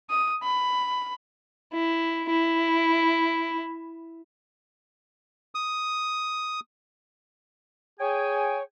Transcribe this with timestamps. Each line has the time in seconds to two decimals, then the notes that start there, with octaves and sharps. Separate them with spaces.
0.10 D#6
0.43 B5
1.73 E4
2.30 E4
5.55 D#6
7.99 G#4 C#5 G5 G#5